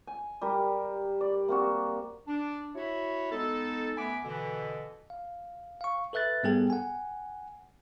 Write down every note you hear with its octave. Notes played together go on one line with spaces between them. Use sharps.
G#5
G3 G4 A#4
D5
A#3 C4 F#4
D4
E4 F#4 C#5
G#3 B3 D#4 A4
F#2 A3 B3 G#5 B5 D6
B2 D3 E3
F5
F5 C#6
A4 B4 E5 F#6 A6
G#2 G3 B3 G#4 A4 G5
F#5 G#5